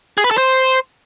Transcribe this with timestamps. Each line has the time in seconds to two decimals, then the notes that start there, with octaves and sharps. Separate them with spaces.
0.18 G#4
0.24 B4
0.31 A4
0.38 C5